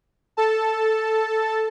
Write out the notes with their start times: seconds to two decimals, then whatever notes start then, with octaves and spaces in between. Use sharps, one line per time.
0.37 A4 A5